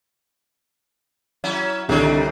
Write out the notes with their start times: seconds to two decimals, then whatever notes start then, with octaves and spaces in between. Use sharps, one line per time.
1.44 F#3 C#4 E4
1.89 C2 D3 D#3 G3 C#5